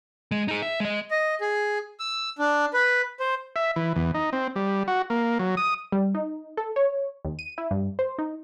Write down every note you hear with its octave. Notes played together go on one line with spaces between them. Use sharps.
G#3
D#4 G#4
E5
G#3 D#5
D#5
G#4
E6
D4
B4
C5
E5
E3
E2
D#4
C4
G3
F#4
A#3
F#3
D#6
G3
D#4
A4
C#5
D#2
D#7
E4
G2
C5
D#4